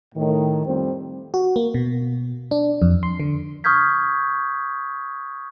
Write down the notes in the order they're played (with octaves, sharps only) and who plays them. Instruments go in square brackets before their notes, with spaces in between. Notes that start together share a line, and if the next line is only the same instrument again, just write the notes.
[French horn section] A2 D#3
F2 G3 C4 C5
[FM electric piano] F#4
A#3
B2
D4
F2
C6
D3
[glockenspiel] C#6 D#6 F6 G6 G#6 B6